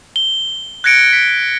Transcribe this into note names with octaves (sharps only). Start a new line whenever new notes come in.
G7
F#6 G#6 A#6 C#7 D7
B6